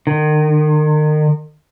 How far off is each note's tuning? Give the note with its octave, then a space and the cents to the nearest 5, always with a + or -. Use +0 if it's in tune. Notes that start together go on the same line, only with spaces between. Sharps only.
D#3 -35